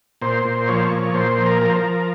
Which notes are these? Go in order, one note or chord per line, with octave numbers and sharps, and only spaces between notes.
A#2 C5
A#2
F3 C#5
C5
C#5
A#2
A#2 C5
F3
A#4
F3
C5
A#4
F3